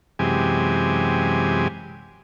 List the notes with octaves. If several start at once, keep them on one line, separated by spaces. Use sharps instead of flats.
F#2 C3 E3 G#3 G4 G#5